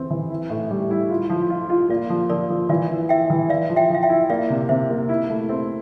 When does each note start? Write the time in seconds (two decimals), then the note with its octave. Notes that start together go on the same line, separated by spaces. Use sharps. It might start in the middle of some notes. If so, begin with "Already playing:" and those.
Already playing: E3 C4
0.10 E3
0.30 E4
0.50 A2
0.71 G3
0.91 E4
1.10 F4
1.30 F3
1.50 F4
1.69 F4
1.89 A#3 D5 F5
2.10 F3
2.30 F3 A#4 D5
2.50 F3
2.69 E3 D5 F5
2.90 E4
3.09 E4 E5 G5
3.30 E3
3.49 E4 D5 F5
3.69 F3
3.76 E5 G5
3.90 F3 F5
4.03 E5 G5
4.09 E4
4.30 A#3 D5 F5
4.50 C3
4.69 C3 C5 E5
4.90 A#3
5.09 E4 F4
5.30 A3
5.49 C4